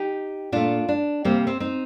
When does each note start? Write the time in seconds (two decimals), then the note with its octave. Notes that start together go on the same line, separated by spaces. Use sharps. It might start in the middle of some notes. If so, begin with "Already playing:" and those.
Already playing: D#4 G4
0.52 A#2 A3 D4 F4
0.89 D4
1.25 C3 G3 A#3 C4
1.47 C4
1.60 C4 D#4